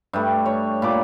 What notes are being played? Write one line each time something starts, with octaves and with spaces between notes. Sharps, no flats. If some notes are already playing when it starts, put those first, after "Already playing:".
G2 G3 A3
C#5
A#2 B5 D6